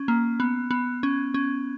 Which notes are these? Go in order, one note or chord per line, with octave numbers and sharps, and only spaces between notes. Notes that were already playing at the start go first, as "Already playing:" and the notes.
Already playing: C#4
A#3
B3
B3
C#4
C#4